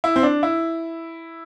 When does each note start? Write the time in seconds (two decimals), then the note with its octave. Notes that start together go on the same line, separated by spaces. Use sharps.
0.04 E4
0.16 C4
0.23 D4
0.43 E4